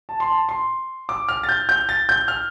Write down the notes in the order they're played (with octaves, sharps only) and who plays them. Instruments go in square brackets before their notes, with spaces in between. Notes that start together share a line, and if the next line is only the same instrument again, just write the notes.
[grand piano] A5
C6
A5
C6
D6
F6
A6
G6
G6
A6
G6
F6